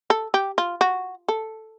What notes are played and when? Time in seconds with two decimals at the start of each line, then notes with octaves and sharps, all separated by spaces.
0.10 A4
0.34 G4
0.58 F4
0.81 F#4
1.28 A4